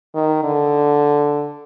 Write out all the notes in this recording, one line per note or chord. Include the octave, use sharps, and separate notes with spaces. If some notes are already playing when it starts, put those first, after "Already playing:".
D#3
D3